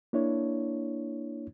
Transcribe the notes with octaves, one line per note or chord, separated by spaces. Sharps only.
A#3 D4 E4 C#5